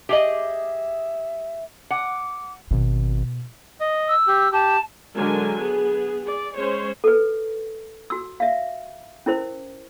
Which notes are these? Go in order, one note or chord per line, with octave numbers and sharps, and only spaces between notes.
G4 G#4 D#5 E5
F#5 D6
G#1 B2
D#5
E6
G4
G4 A5
D3 F#3 G#3 D4 A#4 G#5
B3 G#4
G#4 D5
G#3 C#4 C5 C#5
A4 B4
F#4 E6
E5 F5
C#4 E4 A#4 C5